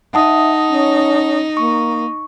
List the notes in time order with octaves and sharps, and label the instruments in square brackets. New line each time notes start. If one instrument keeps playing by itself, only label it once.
[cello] D#4 [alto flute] E5 [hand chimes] F#5 A5 D#6
[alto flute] C#4
[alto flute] A#3 [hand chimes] C#6